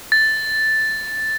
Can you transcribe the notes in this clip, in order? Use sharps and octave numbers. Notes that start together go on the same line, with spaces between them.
A6